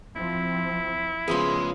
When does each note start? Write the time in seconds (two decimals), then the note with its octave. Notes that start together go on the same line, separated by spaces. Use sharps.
0.16 F3 C4 E4
1.28 C#3 F3 B3 G#4 B4 C6